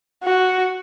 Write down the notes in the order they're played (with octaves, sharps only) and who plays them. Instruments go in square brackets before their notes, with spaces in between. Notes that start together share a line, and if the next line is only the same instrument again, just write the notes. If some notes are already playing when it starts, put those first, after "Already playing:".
[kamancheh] F#4